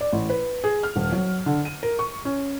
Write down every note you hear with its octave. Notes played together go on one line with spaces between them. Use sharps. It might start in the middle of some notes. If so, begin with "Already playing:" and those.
D5
A1
B4
G#4
F6
D#1
F#3
D3
D#7
A#4
C#6
C#4